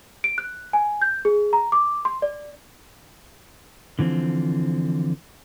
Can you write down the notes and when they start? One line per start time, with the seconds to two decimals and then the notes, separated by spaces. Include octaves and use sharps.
0.24 D7
0.38 F#6
0.73 G#5
1.01 G6
1.25 G#4
1.53 A#5
1.72 D6
2.05 C6
2.22 D5
3.99 D3 E3 F3 C4